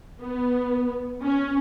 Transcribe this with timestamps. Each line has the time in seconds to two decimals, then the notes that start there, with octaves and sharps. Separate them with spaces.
0.21 B3
1.23 C#4